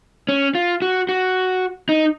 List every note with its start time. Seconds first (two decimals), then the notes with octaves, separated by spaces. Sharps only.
0.29 C#4
0.55 F4
0.82 F#4
1.09 F#4
1.89 D#4